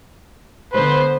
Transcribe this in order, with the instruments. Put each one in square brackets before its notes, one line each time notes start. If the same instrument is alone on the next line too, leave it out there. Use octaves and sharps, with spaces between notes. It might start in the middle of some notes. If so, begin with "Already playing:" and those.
[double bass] D3 B3 [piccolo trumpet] B4 [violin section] C5